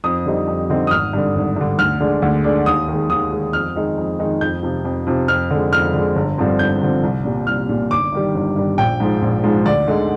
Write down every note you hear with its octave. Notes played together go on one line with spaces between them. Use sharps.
F2 D#6
D3 G3 C4 D#4
F2
D3 G3 C4 D#4
D#6
G#1 F6
G2 D3
G#1
G2 D3
D2 F6
D3 G#3 D4
D2
D3 G#3 D4
D#2 D#6
D#3 G#3
D#2 D#6
D#3 G#3
F2 F6
D#3 G#3 D#4
F2
D#3 G#3 D#4
F2 G6
C3 F3
F2
C3 F3
F2 F6
D3 G#3
F2 F6
D3 G#3
G1
G2 D3 F3 C4
G1 G6
G2 D3 F3 C4
C2
A#2 G3
C2 F6
A#2 G3
G1 D6
G2 D#3 G3
G1
G2 D#3 G3
A#1 G5
G#2 F3 G#3
A#1
G#2 F3 G#3
D2 D5
D3 G#3 D#4